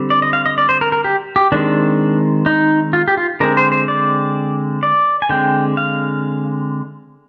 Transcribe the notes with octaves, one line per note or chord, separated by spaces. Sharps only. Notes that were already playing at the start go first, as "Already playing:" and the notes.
Already playing: D3 G3 C4
D5
D#5
F5
D#5
D5
C5
A#4
A#4
G4
G4
D#3 G#3 C4 D4
D#4
F4
G4
F4
D3 G#3 C4 A#4
C5
C5
D5
D5
G#5
D3 G#3 C4 G5
F5